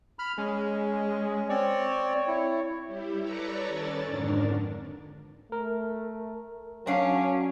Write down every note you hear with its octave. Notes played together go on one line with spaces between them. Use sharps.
B5 F6
G#3 C#4
C4 C#5 D5
E4
G3 E4 G4
A4 B4 C#5 D5 A#5 C#6
D#3 C#4 A4 D5 A6
F2 G#2 D3 D4 A#4
A3 A#4
F#3 C#4 D4 F5